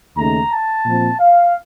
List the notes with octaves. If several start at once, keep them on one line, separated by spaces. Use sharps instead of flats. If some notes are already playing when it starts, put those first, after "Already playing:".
D#2 C#3 A3 D#4 A#5
A5
A#2 F3 C4
F5